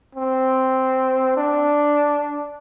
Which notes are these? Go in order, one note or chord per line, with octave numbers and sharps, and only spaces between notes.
C4
D4